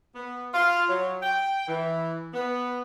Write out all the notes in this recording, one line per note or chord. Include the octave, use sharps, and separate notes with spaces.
B3
F4
F#3
G5
E3
B3